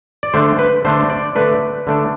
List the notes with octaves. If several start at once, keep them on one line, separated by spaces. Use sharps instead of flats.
D5
D3 A3 D4 C5
B4
D3 A3 D4 C5
D5
D3 A3 D4 B4
D3 A3 D4